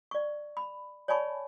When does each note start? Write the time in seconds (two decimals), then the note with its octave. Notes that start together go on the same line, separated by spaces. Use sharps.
0.11 D5 C#6
0.57 B5
1.08 C#5 D5 G#5 A5 B5 C#6